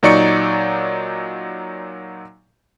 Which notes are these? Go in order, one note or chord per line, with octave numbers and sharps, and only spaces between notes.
A#2 F#3 D#4 D5 C#6 C#7